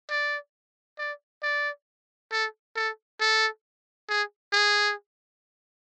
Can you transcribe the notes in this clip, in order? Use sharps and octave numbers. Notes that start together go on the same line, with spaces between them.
D5
D5
D5
A4
A4
A4
G#4
G#4